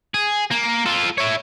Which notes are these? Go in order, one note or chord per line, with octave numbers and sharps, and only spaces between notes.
G#4
A#3
F4 A4
E4 C#5